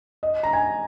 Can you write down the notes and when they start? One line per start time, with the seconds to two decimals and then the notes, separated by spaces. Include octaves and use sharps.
0.23 D#5
0.43 A#5
0.53 G#5